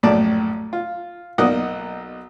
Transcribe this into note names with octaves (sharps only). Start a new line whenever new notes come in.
A#1 F#2 A2 D5 A5
F4
B1 A#3 D#4 D5 D#5 F#5